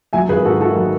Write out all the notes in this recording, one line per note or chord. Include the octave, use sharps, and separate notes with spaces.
F#3 E5 G#5
G#1 G#4 B4
G#2 F#4 A4
D#3 F#4 A4
F#3